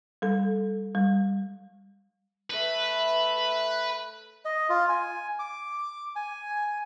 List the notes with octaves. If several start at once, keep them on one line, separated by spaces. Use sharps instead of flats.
G3 A4
G3
A3 B4 E5
D#5
F4
G#5
D6
G#5